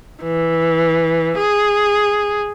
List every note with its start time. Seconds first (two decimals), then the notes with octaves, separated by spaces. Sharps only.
0.23 E3
1.38 G#4